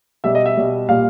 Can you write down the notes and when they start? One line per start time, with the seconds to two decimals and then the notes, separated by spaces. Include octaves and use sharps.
0.24 B2 G3 E5
0.35 D#5
0.46 E5
0.57 B2 G3
0.89 A#2 G3 F5